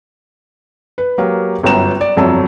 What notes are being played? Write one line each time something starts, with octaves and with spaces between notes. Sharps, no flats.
B4
F#3 A#3 G4 A#4
G1 F#2 B3 G5 A#5 E7
D5
G1 F2 F#3 A5 A#5 E6